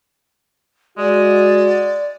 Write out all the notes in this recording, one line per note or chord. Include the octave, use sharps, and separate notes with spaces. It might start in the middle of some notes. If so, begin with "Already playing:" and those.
G#3 F#4 D5